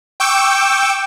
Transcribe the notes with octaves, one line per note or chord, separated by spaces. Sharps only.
G5 C#6 D6 E6 G6